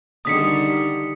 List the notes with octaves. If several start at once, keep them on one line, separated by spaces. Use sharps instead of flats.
D3 D#3 G3 D#6 B6 C#7